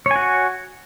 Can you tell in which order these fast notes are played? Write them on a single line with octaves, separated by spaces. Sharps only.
C#5 G#5 F#4